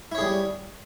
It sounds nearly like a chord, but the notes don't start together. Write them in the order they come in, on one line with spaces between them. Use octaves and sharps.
E4 C#5 G#4 G3